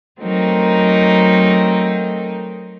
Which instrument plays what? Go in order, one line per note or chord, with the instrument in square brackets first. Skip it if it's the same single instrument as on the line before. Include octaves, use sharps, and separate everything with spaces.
[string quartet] F#3 A3 C4 D#4 A#4